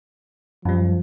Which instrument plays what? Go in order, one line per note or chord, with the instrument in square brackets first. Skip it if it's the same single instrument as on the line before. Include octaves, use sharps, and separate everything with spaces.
[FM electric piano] F#2 G3 [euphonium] F3